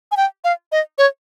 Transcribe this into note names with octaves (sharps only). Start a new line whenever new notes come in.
G#5
G5
F5
D#5
C#5